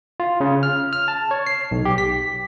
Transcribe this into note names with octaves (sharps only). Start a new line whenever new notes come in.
F4
C#3
F6
F6
A5
C#5
C7
B1
G4
B6